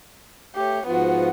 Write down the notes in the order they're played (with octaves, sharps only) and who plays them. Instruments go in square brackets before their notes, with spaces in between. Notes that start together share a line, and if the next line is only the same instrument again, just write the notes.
[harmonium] A3 [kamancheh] G4 C#5
[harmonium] G#2 F3 F4 [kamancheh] B3 F#4